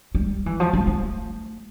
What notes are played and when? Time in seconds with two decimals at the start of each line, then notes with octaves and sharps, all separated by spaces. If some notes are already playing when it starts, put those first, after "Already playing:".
0.15 G3
0.46 E3
0.60 F3
0.73 G3
0.87 A3